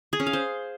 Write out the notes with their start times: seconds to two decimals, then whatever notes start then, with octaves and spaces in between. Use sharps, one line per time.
0.13 G#4
0.20 C#4
0.26 F5
0.33 C5